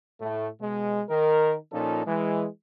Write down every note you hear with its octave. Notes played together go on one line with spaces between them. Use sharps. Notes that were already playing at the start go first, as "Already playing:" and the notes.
A2 A3
B2 G#3
D#3 A#4
A#2 F3 C#4 D#4 A4
E3 G#3